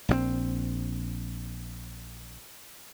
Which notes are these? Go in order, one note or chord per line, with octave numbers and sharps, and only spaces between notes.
A#1 F3 C4